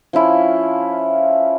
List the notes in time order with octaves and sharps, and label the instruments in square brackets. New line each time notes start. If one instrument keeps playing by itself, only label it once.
[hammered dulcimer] F3 C#4 E4 F4